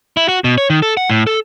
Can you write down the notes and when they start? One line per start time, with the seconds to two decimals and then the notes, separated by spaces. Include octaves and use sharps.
0.17 E4
0.28 F#4
0.44 B2
0.58 C#5
0.70 D#3
0.82 A4
0.97 F#5
1.10 A2
1.27 A4